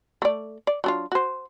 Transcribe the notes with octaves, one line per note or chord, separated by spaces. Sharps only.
A3 D5
D5
F#3 D4 F4
F#4 C5